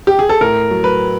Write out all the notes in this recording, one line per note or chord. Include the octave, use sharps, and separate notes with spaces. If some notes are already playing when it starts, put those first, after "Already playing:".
G4
G#4
A4
A2 A#4
F#3
B4